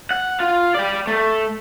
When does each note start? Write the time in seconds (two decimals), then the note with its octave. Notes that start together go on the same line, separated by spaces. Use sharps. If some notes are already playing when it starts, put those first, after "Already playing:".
0.11 F#5
0.40 F4
0.75 D5 G5
1.07 A3